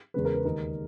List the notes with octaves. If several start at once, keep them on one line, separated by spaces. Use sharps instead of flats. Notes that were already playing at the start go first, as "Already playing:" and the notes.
E2 C#3 G#3 B4
A#4
B4
D#2 D#3 G#3 D#4 A#4